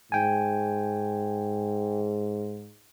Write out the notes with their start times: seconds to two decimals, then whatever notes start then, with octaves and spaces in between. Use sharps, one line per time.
0.12 G#2 G5 G#5